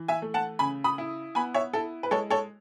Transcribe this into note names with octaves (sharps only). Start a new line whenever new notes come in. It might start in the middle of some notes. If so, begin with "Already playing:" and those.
Already playing: E3
E5 G#5
A3
F#5 A5
C#3 G#5 B5
B5 D#6
E4
B3 G#5 B5
C#5 E5
E4 A4
B4
G#3 A4 C#5
A4 C#5